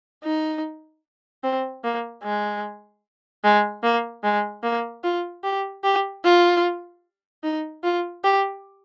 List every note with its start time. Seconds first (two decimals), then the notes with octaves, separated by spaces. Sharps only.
0.24 D#4
1.44 C4
1.84 A#3
2.24 G#3
3.44 G#3
3.83 A#3
4.24 G#3
4.63 A#3
5.04 F4
5.43 G4
5.84 G4
6.24 F4
7.43 D#4
7.84 F4
8.24 G4